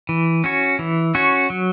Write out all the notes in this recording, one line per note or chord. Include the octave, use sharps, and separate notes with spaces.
E3
C#4 F#4 C#5
E3
C#4 F#4 C#5
F#3